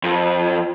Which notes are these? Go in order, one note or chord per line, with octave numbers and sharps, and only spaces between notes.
F2